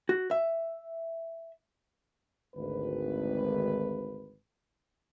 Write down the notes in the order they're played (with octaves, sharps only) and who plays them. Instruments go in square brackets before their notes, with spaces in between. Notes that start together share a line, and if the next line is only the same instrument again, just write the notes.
[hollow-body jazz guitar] F#4
E5
[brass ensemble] G#1 D2 B4